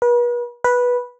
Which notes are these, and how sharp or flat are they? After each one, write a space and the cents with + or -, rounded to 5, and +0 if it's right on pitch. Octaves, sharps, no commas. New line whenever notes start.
B4 -40
B4 -10